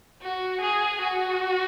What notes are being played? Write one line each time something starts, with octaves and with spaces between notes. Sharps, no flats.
F#4
G#4
F#4